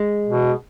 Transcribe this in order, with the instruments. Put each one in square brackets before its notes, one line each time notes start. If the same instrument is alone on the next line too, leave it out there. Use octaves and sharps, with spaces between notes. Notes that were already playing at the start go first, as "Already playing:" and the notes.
Already playing: [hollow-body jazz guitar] G#3
[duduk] B2